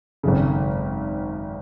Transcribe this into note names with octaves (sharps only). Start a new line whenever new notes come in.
G#1 F#2 C#3